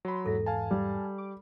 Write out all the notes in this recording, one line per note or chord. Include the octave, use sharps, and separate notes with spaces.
F#3 B5 C6
E2 G#2 E3 G#4 A4 E5
F5 G#5 A5
G3
D6